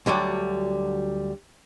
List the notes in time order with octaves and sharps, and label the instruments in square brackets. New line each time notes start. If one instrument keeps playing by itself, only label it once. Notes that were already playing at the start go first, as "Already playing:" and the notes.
[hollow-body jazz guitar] D2 D3 F#3 G3